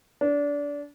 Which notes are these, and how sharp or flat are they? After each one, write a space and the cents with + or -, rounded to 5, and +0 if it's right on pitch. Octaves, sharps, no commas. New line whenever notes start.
D4 -25